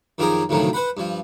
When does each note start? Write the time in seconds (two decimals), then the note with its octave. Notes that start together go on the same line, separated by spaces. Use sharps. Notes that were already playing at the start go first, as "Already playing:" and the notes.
0.18 F#2 D#3 F3 G4 G#4 A#4
0.49 D2 A2 C3 D#3 F3 F#3
0.73 B4 C5 F#5 B5
0.97 G2 F3